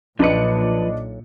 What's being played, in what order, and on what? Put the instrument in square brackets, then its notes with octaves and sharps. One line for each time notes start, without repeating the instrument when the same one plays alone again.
[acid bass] B1 [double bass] A#2 [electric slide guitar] F3 B4 [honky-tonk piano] D4 D#5 C#7